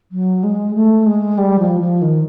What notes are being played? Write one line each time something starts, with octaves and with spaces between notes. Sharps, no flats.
F#3
G#3
A3
G#3
G3
F3
F3
D#3